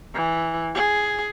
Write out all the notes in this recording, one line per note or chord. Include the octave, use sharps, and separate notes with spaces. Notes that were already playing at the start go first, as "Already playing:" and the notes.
E3
G#4